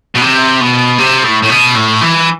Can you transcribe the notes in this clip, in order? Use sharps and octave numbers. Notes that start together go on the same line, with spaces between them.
B2
C3
B2
C3
A2
A2
B2
A2
E3